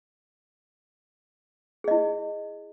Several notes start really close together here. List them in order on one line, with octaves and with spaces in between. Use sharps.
G#4 D#5 E4